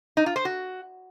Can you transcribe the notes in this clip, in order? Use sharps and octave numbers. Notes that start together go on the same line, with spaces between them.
D#4
F4
C5
F#4